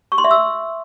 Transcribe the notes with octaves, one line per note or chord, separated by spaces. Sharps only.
C#6
C6
E5
E6